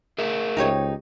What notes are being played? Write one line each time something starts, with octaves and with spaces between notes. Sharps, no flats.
G#4 A#4 E5
C#2 D#4 G4 C#5